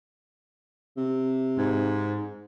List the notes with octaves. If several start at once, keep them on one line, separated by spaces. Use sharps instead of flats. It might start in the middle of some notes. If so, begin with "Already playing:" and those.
C3
G#2